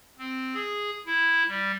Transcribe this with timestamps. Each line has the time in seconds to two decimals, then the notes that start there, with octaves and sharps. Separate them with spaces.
0.19 C4
0.55 G#4
1.06 E4
1.48 G3